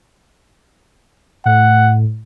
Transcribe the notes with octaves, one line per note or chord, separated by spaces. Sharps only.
A2 F#5